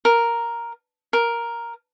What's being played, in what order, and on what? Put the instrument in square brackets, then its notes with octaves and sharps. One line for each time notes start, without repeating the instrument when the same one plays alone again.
[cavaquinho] A#4
A#4